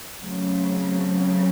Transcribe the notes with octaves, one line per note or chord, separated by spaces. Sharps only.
C#3 F#3 A3 C4